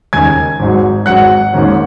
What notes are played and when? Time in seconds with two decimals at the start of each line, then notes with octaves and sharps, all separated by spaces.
0.13 D#2 C#3 A#3 D#4 G#5 G#6
0.60 G#1 G#2 F#3
1.06 G#1 G#2 F#3 F#5 F#6
1.53 G#1 G#2 D#3 A#3 C#4